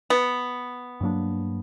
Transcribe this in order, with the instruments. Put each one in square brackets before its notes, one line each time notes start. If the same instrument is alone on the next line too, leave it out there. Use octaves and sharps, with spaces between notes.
[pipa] B3
[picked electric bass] G2 F#3 A#3 D4